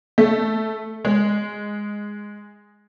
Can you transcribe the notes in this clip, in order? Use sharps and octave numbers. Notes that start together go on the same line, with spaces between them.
A3
G#3